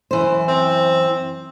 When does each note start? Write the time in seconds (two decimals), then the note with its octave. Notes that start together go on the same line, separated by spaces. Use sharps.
0.11 F#2 E3 C5
0.48 C4